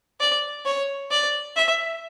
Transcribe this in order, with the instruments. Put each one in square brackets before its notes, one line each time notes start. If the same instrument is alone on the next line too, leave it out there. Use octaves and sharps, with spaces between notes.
[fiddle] D5
C#5
D5
E5